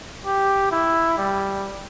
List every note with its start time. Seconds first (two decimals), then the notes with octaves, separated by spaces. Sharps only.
0.25 G4
0.71 E4
1.18 G3